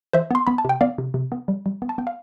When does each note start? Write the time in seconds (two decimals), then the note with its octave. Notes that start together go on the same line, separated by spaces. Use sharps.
0.13 E3 C5 E5
0.31 B3 C6
0.47 B3 B5
0.58 A5
0.65 C3 G5
0.81 B3 D5 F5
0.98 C3
1.14 C3
1.32 B3
1.48 G3
1.66 G3
1.82 B3
1.89 A5
1.98 B3 G5
2.07 F5